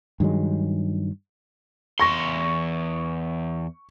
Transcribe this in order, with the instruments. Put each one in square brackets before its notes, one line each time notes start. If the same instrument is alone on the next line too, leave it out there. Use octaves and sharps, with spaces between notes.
[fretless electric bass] G2 D#3 F#3 G#3
[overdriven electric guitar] E2 C6 [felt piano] C#6 A#6